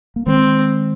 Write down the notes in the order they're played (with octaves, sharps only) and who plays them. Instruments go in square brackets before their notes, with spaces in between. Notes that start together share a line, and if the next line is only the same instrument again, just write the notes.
[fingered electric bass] A#3
[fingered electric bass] D#3 G#3 [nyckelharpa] C4